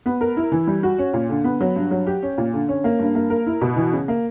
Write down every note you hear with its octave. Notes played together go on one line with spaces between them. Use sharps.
B3
A#4
E4
E3
G3
F#4
C#4
A#2
D3
B3
F#3
G2
F#3
G4
C#4
A#2
D3
C#4
A#3
G2
A#3
A#4
E4
B2
E3
C#3
A#3